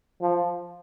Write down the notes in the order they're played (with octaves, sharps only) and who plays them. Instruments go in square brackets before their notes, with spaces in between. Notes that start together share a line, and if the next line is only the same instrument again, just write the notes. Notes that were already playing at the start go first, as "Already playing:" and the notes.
[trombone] F3